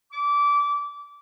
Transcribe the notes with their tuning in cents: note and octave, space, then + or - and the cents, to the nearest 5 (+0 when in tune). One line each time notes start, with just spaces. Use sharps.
D6 -20